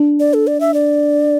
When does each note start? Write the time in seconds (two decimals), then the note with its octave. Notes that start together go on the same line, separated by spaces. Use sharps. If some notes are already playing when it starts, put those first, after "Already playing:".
Already playing: D4
0.20 D5
0.34 A4
0.47 D5
0.60 E5
0.74 D5